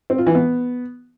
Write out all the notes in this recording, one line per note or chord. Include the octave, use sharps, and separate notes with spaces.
C4
F4
E3
B3